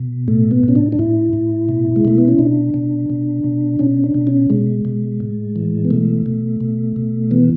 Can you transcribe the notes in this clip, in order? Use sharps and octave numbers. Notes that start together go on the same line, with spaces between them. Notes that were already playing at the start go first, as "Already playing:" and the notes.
Already playing: B2
A2 A3
B3
A2 C#4
D4
D4
A2 E4
A2
B2
G#3
B2 A3
B3
C#4
B2 D4
B2
B2
B2
B2 C#4
D4
B2
C#4
B2 G#3
B2
A2
E3
B3
B2 A3
B2
B2
B2
E3 B3